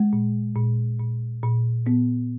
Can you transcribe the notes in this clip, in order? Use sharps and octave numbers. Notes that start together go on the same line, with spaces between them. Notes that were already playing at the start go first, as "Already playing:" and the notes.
Already playing: G#3
A#2
A#2
A#2
A#2
A#2 B3